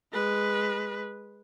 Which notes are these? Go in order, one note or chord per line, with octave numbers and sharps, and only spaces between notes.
G#3 B4